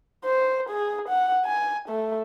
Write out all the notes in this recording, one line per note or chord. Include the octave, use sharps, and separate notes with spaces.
C5
G#4
F#5
G#5
A3